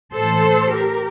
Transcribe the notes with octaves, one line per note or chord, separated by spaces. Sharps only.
A2 E3 A4 C5
G4 A#4